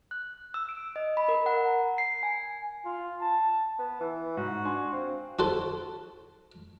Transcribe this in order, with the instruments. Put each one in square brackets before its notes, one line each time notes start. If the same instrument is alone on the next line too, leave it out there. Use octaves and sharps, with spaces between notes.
[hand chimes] F#6
E6
D7
D#5
B5
A#4
F#5
A#5
C7
G#5
[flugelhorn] F4
A5
[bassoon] B3
E3
[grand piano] G#2 [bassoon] F#4
[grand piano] D4 G#5 C6
[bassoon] C4 [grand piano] F5
[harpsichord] F#4 A4 C5